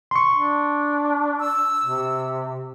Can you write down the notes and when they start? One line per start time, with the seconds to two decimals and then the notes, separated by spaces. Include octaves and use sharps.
0.11 C6 C#6
0.33 D4
1.40 E6
1.84 C3